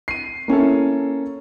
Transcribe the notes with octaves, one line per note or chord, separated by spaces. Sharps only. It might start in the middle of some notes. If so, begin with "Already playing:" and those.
C7 D#7
A#3 C#4 E4 A4